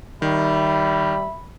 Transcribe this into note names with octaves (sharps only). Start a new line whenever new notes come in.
D#3 G3 E5 B5